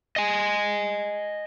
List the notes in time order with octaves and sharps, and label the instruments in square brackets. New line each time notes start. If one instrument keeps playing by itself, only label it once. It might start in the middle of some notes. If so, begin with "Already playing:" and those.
[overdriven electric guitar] D#5 G#5